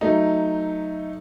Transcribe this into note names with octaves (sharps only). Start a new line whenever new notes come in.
F#3 A3 D#4